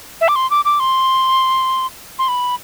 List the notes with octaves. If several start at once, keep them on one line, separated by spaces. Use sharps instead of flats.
E5
D6
C6
D6
D6
C6
C6
B5